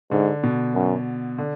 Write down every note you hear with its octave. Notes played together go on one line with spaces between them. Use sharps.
G#2 D3
B2
F#2
D3